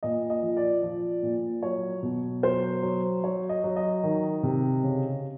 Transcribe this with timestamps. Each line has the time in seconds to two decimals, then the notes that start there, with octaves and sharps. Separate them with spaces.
0.03 A#2 D#5
0.30 D#5
0.42 F3
0.57 D5
0.82 F3
1.23 A#2
1.63 F#3 C#5
2.03 B2
2.43 F#3 C5
2.83 F#3
3.23 F#3 C#5
3.49 D#5
3.64 F#3
3.76 D#5
4.03 D#3
4.43 C3
4.83 C#3